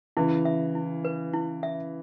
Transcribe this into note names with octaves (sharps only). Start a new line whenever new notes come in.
C#3 E3 E4
E5
E4
B4
E4
E5